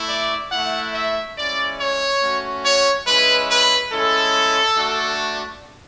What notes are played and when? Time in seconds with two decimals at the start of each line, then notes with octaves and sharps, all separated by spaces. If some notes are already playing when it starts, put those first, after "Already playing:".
Already playing: A3 E4
0.09 D5
0.52 A3 E4 F#5
0.95 E5
1.37 G#3 C#4 E4 D5
1.80 C#5
2.22 A3 C#4 F#4
2.65 C#5
3.07 G#3 C#4 E4 B4
3.50 B4
3.92 G#3 C#4 E4 A4
4.77 A3 D4 F#4